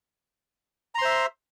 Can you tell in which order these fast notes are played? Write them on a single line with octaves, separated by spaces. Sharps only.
A#5 C6 C5 E5